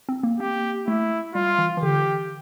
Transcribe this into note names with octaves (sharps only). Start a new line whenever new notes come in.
C4
A#3
A#3 G4
A3 E4
G3 F4
E3
E3
D3 G4